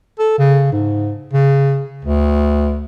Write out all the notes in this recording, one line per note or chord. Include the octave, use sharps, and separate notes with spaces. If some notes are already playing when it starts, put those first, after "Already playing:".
A4
C#3
G#2
C#3
D2